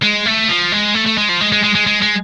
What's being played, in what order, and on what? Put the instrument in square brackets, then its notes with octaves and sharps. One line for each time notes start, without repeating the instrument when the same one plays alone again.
[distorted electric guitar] G#3
A3
F3
G#3
A3
A3
G#3
F3
G#3
G#3
G#3
G#3
G#3
G#3